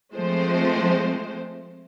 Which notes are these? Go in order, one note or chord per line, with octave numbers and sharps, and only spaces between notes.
F3 G#3 A3 C4 C5